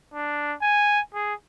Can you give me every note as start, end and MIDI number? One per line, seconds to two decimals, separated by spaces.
0.14 0.54 62
0.62 1.00 80
1.14 1.34 68